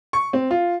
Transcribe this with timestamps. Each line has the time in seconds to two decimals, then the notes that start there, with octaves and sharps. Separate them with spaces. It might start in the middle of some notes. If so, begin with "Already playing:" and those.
0.13 C#6
0.33 C4
0.51 F4